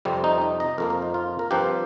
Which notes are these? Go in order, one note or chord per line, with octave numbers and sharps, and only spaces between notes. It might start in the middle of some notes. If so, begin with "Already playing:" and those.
F2 C3 G3 C4
D#4
D#4
D#5
F2 F3 A#3 A#4
A#4
D#4
F4
A#4
G2 F3 C4 G4